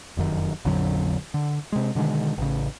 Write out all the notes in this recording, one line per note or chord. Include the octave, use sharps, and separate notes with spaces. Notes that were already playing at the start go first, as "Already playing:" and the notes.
F1 F#2 D#3
A#1 F2 D3 F#3
D3
C3 G#3
B2 D3 D#3 G#3
A1 C#3